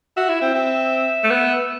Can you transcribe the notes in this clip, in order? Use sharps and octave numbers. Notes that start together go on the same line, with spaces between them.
F#4 E5
E4
C4
C4
A3
B3